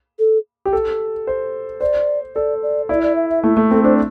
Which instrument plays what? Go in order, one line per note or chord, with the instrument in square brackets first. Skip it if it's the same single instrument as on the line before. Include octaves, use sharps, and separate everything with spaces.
[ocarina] A4
[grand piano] G4
A4
C5
[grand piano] C5 [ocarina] D5
[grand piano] A4 [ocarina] D5
[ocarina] D5
[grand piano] E4 [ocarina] D5
[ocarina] D5
E5
E5
[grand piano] A3 [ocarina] E4
[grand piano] A3
[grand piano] C4 [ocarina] A4
[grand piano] D4 [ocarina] C5